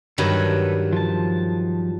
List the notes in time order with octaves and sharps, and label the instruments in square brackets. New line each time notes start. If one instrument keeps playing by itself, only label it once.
[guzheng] G2 D#3 F#3 [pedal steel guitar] A4 B4
[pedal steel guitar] F3 A5